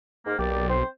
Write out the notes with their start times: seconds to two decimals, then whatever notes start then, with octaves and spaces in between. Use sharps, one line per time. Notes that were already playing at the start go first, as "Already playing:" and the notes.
0.26 G#2 A#3
0.39 B1 A#3 G4 D5
0.70 C4 C5